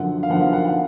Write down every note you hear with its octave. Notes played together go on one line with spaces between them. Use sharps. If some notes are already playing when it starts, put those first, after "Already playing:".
Already playing: F#2 D3 F3 F#5
F5
F#2 D3 F3 F#5
F5
F#5
F#5